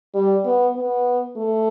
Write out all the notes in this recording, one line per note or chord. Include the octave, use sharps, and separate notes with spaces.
G3
B3
B3
A3